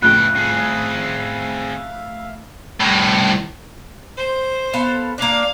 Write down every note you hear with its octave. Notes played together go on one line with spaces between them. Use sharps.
F2 A2 C#3 B3 E5 F5 G5 F#6
C4 G#4
C2 A2
C5
B3 A4 F5
A#3 D4 F5